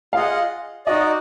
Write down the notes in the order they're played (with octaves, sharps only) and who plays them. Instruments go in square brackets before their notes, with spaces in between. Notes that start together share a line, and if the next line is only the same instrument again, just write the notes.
[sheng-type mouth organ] F4 G#4 D#5 F#5 [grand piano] F5
[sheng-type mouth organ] D#4 F#4 D5 [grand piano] D#5